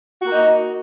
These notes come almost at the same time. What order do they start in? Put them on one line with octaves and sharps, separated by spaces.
F#4 A#3 D#4